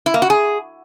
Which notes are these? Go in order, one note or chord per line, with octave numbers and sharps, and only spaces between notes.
E4
A#3
F#4
G#4